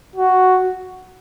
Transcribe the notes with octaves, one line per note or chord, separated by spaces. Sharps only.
F#4